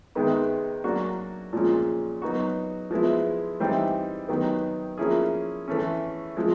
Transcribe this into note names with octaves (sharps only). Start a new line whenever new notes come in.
C3 D#3 G#3 B3 D#4
F#3 A#3 D4 F#4
A#2 F3 G#3 C#4
F#3 B3 D#4 F#4
F3 G#3 B3 E4
E3 G3 C4 D#4
D#3 F#3 B3 D#4 G4
F3 A#3 C#4 E4 G#4
E3 A3 C#4
F3 G#3